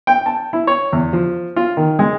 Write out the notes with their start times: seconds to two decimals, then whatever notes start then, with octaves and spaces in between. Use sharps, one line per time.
0.07 G5
0.26 A5
0.53 E4
0.67 C#5
0.93 E2
1.13 F3
1.56 F4
1.77 D#3
1.99 G#3